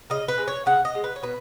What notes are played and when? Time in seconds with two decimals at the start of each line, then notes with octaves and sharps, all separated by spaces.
0.10 C#3 D#5
0.28 B4
0.38 G#3
0.48 C#5
0.66 C#3 F#5
0.85 D#5
0.95 G#3
1.04 B4
1.16 C#5
1.22 B2 B4